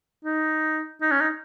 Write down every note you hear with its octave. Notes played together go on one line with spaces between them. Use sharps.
D#4
D#4
C#4
D#4